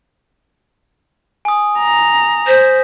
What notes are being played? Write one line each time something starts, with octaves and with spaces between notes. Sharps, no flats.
G#5 D#6
A#5
C5 A#6 B6